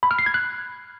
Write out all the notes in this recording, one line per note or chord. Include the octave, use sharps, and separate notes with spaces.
B5
F6
C7
G#6
F#6